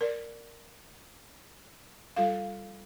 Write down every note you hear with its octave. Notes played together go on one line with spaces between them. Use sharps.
A#4 D5
G3 F4 A4 F5